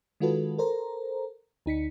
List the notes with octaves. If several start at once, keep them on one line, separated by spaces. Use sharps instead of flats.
D#3 G#3 F4 F#4 A4 B4
A4 A#4 C5 A#5
D2 D#4 B6 C#7